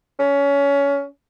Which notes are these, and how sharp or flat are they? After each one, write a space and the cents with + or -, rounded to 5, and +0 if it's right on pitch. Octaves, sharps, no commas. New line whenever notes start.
C#4 +25